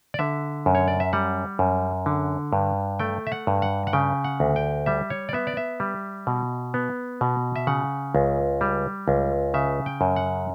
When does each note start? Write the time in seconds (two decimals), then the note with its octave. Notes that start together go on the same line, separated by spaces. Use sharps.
0.14 D5
0.19 D3 E5
0.66 F#2
0.75 C#5
0.88 D5
1.00 E5
1.13 G3 F#5
1.59 F#2
2.06 D3
2.53 G2
2.99 A3 G5
3.27 E5
3.32 F#5
3.47 G2
3.62 F#5
3.87 F#5
3.93 C#3 G5
4.24 F#5
4.40 D2
4.56 G5
4.86 G3 E5
5.10 C#5
5.29 D5
5.33 B3 E5
5.47 D5
5.57 E5
5.80 G3
6.27 B2
6.74 B3
7.21 B2
7.56 E5
7.67 C#3 F#5
8.15 C#2
8.61 G3
9.08 C#2
9.54 C#3 E5
9.86 G5
10.01 F#2
10.16 F#5